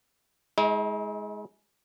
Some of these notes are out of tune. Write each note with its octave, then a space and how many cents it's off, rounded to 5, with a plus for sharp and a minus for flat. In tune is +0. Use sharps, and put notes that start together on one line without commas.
G#3 +15 E4 -45